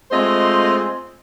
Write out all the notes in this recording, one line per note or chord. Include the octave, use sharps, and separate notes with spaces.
G#3 A3 C4 F4 C5 D#5